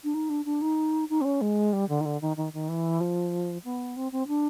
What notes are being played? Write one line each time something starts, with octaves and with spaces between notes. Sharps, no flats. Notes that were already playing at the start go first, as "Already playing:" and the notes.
D4
D#4
D4
D4
D#4
D#4
C4
C#4
G#3
G3
D3
D#3
D3
D#3
D#3
D#3
E3
F3
B3
C4
C4
D4